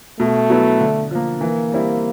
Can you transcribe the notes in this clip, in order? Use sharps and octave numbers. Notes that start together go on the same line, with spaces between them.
B2 A3
F#3 B3 E4
D3
F3 A#3
E3 A#3
G3 C4 E4